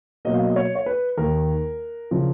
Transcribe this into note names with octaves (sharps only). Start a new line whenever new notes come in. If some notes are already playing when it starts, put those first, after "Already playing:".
B2 F#3 A#3 D#5
F5
D#5
C#5
C#5
B4
D#2 D#3 A#3 A#4
C#3 F3